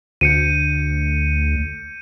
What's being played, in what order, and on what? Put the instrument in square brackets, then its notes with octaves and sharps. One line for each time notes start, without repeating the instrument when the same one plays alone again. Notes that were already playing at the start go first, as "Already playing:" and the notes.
[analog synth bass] D2 [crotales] G6 C#7 D#7